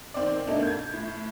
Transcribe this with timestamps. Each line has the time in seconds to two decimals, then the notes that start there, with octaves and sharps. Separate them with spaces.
0.14 D#3 C4 D5
0.47 B2 A3 A#3 D4 D#4
0.63 G6 G#6
0.93 A2